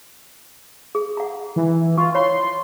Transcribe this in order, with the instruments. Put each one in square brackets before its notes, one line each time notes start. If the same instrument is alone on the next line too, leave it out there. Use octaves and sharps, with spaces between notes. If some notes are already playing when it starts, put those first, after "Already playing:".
[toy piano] G#4
F#5 A#5
[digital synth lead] E3
[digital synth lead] F4 [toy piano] C#6
[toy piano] C#5 B5 [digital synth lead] C6